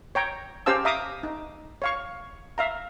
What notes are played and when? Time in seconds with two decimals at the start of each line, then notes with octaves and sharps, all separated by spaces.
0.15 C#5 G5 A#5
0.66 C#4 G4 C5 F5 A5 E6
0.85 E5 F5 A#5 D6 D#6
1.23 D#4
1.82 C#5 F5 C#6
2.58 E5 F5 A#5